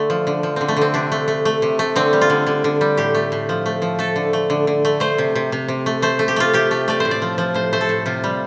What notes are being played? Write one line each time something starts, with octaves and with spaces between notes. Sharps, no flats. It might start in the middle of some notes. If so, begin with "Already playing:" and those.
Already playing: D3 A3
F3
D3
F3
D3 C4
A3
D3 C4
C3 D4
A3
A3
A3
C3
A3
D3 C4
G3
F4
D3
D3
D3
G3
A2 G4
A3
A2
F3
A3
F3
A3 A4
D3
A3
D3
D3
A3
A3 C5
C3
C3
C3
C3
A3
A3 C5
A3
G4
A3 F4
C3 G4
A3
A3 D5
A2 C5
D5
F3
F3
A2 C5
A3 C5
A4
A2
C3 F4
G3